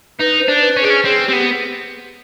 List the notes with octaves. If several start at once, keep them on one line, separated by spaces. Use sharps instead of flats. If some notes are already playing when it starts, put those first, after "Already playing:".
D#4 B4
C5
D4
B4
C#4
D4 G#4
C#4
C4 G#4
C4 G4
B3